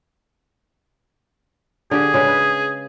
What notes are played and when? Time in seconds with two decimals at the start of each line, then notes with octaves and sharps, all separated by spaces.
1.91 D3 G4 G#4
2.14 C#3 G#3 B4
2.28 B4